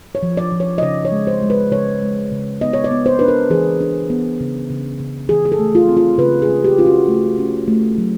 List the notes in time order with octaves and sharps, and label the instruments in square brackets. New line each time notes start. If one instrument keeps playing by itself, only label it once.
[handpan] C#5
F3
D5
F3
C#5
D#5
C#3 D5
C#5
G#3
C5
G#3
B4
C#3 C#5
G#3
C#3
B3 D#5
C#5
D5
B3
C5
D4 B4
A#4
E3 G#4
D4
B3
C#3
C#3
C#3
E3 G#4
G#4
A4
A3
F4
C4
F4
C#3 B4
G#4
C#4
G4
C#4 F4
F#4
A3
C#4
A3
F#3